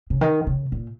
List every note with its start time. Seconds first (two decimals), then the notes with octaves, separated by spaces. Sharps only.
0.10 C#3
0.21 D#3
0.47 C#3
0.72 A#2